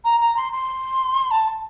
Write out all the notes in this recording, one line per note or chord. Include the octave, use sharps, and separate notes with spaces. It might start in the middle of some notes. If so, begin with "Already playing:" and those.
A#5
A#5
C6
C6
A5